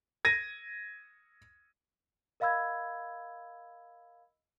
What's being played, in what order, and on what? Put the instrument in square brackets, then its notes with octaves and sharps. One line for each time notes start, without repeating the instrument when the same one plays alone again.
[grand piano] G#6 A#6 D#7
[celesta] A#4 D#5 F5 B5 E6 G#6